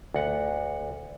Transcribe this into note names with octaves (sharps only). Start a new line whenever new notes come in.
D2 F#5